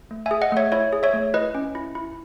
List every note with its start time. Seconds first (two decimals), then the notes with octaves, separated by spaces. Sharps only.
0.11 A3
0.26 E5 G#5
0.31 G#4
0.41 D#5 F#5
0.52 A3 C#5 E5
0.72 E4 C#5 E5
0.93 G#4
1.03 C#5 E5
1.14 A3
1.34 E4 B4 D#5
1.55 C#4
1.75 E4
1.95 E4